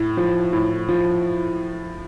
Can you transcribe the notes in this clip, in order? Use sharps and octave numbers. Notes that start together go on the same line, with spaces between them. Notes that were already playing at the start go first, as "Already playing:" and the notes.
Already playing: A2
F3
A2
F3